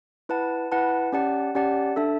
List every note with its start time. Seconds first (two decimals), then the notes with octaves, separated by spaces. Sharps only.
0.29 E4 B4 F#5 A5
0.72 E4 B4 F#5 A5
1.13 C#4 G4 D5 F#5 A5
1.55 C#4 G4 D5 F#5 A5
1.96 D4 A4 E5 A5